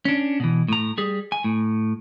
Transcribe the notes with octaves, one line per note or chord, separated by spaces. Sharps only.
C#4 D4
B2 E3
A2 A#5
G3 G#4
G#5
A2